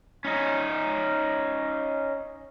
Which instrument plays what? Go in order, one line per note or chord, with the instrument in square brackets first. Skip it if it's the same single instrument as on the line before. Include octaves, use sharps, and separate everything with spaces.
[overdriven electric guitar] C#4 D#4